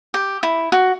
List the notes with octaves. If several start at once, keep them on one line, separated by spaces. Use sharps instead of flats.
G4
E4
F#4